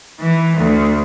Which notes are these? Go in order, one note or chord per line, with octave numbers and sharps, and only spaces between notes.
E3
D2